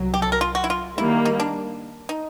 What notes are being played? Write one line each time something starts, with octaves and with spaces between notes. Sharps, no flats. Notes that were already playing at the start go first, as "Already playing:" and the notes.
Already playing: C2 F#3
G4
A4
A#4
F4
F#4
E4
F4
D#3 G3 A#3 E4
D#4
D4
D#4